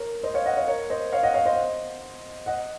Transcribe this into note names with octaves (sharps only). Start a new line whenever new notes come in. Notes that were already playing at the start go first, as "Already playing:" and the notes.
Already playing: A#4 C#5
C5 D#5
C#5 F5
D#5 F#5
C#5 F5
A#4 C#5
C5 D#5
C#5 F5
D#5 F#5
C#5 F5
C5 D#5
D#5 F#5